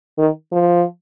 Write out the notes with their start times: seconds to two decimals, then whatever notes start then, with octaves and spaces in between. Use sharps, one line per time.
0.18 D#3
0.52 F3